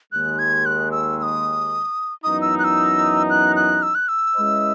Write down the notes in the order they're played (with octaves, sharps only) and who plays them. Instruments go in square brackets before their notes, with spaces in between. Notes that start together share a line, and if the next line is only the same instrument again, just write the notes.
[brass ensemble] D#2 D#3 G#3 [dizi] F#6
[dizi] G#6
F#6
E6
E6
D#6
[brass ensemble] F#2 E3 B3 D#4 [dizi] D#6
[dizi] E6
F#6
E6
F#6
F#6
E6
F#6
E6
[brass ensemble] G#3 C#4 E4 B4 D#5